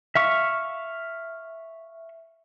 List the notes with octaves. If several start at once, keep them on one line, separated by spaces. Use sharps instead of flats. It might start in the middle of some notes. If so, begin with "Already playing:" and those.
E5 F5 C#6